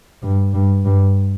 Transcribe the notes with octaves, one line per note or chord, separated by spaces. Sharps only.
G2
G2
G2